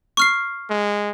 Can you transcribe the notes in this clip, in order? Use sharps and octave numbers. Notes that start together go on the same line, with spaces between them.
C#6 F6 C7
G#3